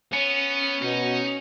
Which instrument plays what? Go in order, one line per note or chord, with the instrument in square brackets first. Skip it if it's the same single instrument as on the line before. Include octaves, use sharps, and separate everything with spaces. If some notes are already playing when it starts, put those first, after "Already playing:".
[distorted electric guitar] B3 [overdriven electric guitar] C#4
[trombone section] B2 [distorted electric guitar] D#4